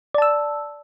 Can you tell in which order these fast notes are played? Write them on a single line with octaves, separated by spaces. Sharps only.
D5 A5 E6